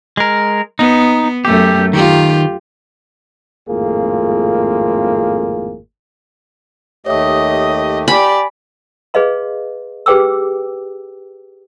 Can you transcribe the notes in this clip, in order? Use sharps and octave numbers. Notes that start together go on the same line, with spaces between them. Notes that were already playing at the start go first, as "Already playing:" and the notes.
G#3 A#4
B3 D#4
F#2 A3 G4
D#3 F4 G4
G#1 F2 A2 A#3 F4 G#4
D#2 A3 G4 C#5 D#5 E5 D#6
G4 D5 G#5 B5
G#4 B4 D#5 F5 C6
G4 G#4 B4 G5 D6 E6